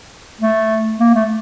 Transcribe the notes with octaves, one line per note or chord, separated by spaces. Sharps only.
A3
A#3
A3